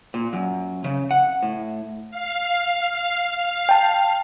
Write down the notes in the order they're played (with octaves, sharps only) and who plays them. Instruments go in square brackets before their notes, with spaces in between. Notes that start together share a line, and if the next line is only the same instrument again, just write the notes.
[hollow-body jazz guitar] A#2
F#2
C#3
F#5
A2
[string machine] F5
[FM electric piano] G5 A5